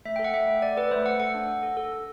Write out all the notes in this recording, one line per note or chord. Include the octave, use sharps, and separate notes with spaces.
A3 E5
A4 G5
F#5
A3 E5
A3
A3 D5
A4 B4
A3 C5
A3 F#5
A4 F#5
D4
A4
A4
A4
A4